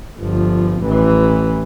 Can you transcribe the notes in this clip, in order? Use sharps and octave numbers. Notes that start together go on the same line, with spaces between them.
G1 F3
A1 E3